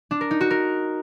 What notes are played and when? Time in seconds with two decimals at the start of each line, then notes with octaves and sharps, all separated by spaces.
0.11 D4
0.21 A#4
0.31 D#4
0.41 F#4
0.51 A#4